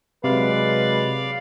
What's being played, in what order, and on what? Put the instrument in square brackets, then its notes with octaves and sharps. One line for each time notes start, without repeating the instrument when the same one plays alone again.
[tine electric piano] C3 [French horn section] F#3 G#3 [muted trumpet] B4 [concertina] D5 F5